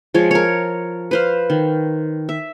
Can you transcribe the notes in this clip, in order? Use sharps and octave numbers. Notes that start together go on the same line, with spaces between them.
F3 G#3 C#5
A#4 C#5
B4 C5 F5
D#3
E5